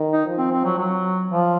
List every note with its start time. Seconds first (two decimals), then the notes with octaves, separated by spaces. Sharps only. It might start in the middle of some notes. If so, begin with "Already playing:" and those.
Already playing: D#3
0.12 D#4
0.26 F3
0.38 C4
0.52 C4
0.64 F#3
0.78 F#3
1.31 F3